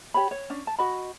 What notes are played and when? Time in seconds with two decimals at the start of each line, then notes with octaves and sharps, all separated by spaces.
0.14 G4 C#5 B5
0.31 C#5
0.50 C#4 D4
0.67 A5
0.79 F#4 D#5 B5